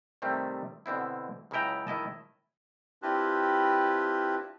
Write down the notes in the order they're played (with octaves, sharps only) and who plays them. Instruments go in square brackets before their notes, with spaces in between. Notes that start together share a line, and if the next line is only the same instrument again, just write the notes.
[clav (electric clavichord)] C3 D#3 G3 A3 C4
B2 D3 C4 E4
C#2 C#3 F#3 E4 G5 A#5
D#3 E4 D#5 A5
[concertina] C4 D4 E4 F4 G4 B4